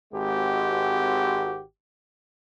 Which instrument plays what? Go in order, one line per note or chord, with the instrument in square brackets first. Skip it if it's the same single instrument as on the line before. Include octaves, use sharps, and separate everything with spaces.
[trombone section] G#1 G#3 C4 F#4 G4